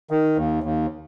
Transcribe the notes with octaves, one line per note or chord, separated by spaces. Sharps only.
D#3
D#2
D#2